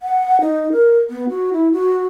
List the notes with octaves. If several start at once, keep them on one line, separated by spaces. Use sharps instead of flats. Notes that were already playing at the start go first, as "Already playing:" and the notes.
F#5
D#4
A#4
B3
F#4
E4
F#4